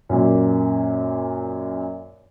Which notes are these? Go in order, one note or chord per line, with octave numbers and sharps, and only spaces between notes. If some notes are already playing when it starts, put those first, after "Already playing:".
F#2 A#2